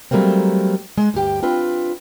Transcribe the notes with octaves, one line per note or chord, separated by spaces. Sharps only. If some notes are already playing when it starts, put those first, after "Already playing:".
F#3 G3 A3 A#3 C4
G#3
D2 G2 G4 G5
C4 D4 F4 B4